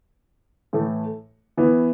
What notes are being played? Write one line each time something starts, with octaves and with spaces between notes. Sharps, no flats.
A2 E3 A3
E3 B3 E4